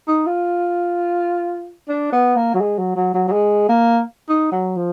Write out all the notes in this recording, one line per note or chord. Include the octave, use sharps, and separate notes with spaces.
D#4
F4
D4
B3
A#3
F#3
G#3
F#3
F#3
F#3
F#3
G#3
A#3
D#4
F#3
F3